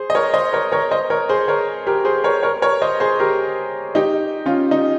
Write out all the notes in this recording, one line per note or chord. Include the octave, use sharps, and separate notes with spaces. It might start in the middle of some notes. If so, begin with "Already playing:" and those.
Already playing: G#4 C5
D#5
A#4 C#5
C5 D#5
A#4 C#5
A#4 C#5
C5 D#5
A#4 C#5
G#4 C5
A#4 C#5
G4 A#4
G#4 C5
A#4 C#5
A#4 C#5
A#4 C#5
C5 D#5
G#4 C5
G4 A#4
D#4 G4
C#4 F4
D#4